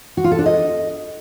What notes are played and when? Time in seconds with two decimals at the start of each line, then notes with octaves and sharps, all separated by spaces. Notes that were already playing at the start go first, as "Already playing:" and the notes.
0.17 F#4
0.24 F4
0.31 A4
0.39 D4
0.46 D#5